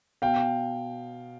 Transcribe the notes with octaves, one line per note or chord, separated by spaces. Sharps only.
B2 F5 G5